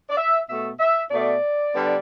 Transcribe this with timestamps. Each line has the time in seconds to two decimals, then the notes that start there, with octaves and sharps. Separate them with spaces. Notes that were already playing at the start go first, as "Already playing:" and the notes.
0.09 D5
0.16 E5
0.47 B2 A3 E5
0.79 E5
1.10 B2 A3 D5
1.74 D3 G3 B3